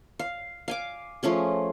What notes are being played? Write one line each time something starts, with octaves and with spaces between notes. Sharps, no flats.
F5
F5 G#5 D6
F3 A3 C#4 G#4